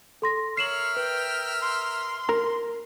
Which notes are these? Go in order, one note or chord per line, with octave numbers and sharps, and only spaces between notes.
A4 C6 A#6
A#4 C#5 E5 F6 C7 E7 F#7
B4 G5
C6
A#4 A#5